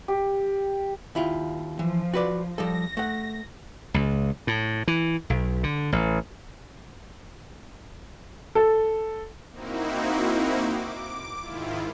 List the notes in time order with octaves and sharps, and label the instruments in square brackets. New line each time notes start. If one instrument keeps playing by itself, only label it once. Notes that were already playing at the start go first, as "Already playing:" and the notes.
[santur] G4
[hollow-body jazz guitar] D#2 E4 F4
[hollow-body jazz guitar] E3 [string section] F3
[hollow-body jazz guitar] F#4 B4 D5
[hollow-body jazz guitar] F3 G3 A4 [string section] A#6
[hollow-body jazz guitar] A3 F#5
[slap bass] C#2
A2
E3
B1
D3
A1
[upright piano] A4
[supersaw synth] A#3 C4 D#4 E4 F#4
D6
G#2 D#3 E4 F4